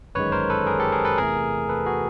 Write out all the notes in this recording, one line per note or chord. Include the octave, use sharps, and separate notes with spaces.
G1 F#2 D#3 G#3 B4 C#5
A#4 C5
A4 B4
G#4 A#4
G4 A4
G#4 A#4
A4 B4
E2 C3 E3 A3 G#4 A#4
A4 B4
F#4 G#4